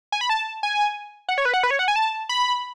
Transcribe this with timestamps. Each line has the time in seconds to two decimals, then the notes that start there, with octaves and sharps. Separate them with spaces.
0.12 G#5
0.21 B5
0.30 A5
0.63 G#5
1.29 F#5
1.38 C#5
1.45 B4
1.54 F#5
1.63 B4
1.71 C#5
1.79 F#5
1.88 G#5
1.96 A5
2.29 B5